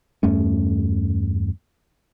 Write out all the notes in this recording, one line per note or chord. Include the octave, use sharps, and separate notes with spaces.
E2 G2 A3 C#4